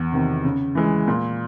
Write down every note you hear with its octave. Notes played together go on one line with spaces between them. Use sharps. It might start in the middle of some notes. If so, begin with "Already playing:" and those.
Already playing: E2
C3 D#3
C#3
E3 G#3
A#2